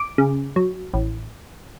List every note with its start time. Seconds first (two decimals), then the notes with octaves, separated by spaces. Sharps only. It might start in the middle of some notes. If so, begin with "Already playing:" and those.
Already playing: D6
0.18 C#3
0.56 F#3
0.93 A1